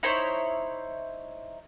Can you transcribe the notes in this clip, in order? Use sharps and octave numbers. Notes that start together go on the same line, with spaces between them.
D#4 E4 C5 C#5